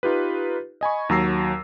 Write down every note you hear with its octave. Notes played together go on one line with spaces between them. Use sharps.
D#4 F4 G4 B4
D#5 G#5 B5 C#6
D#2 F#3 A#5 E6 A#6 C7